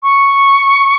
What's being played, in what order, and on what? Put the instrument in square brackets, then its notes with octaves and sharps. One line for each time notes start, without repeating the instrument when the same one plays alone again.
[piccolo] C#6